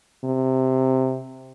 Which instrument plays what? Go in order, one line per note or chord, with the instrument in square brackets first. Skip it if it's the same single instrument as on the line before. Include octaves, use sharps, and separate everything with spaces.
[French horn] C3